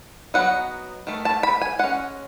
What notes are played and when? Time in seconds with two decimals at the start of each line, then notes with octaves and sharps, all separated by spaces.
0.34 F#3 B3 D#4 F#5
1.07 D#3 A3
1.25 A5
1.43 B5
1.61 G#5
1.79 G#3 C#4 F#5